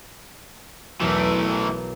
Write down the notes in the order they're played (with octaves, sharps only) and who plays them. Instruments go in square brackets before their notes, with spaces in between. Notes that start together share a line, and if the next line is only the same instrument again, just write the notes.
[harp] B1 E2 A#4 [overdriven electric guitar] E3 A3
[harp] D7 D#7